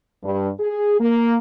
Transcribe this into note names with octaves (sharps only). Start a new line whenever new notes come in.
G2
G#4
A#3